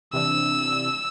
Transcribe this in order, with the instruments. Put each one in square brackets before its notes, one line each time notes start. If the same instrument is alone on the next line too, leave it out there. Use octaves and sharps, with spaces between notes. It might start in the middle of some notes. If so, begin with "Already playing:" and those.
[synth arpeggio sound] C3 E3 D4 [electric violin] E6